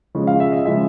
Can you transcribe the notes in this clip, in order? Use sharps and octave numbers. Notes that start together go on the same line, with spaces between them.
C#3 F3 G#3
F5
E5
D#5
C#3 F3 G#3 E5